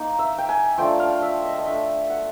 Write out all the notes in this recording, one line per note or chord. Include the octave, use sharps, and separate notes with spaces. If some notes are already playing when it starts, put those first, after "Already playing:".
Already playing: A#3 D#4
E5
G5
G#5
F3 A3 D4 F4 G5
F5
E5
D#5
D#5
A3 D4 F4 E5
F#5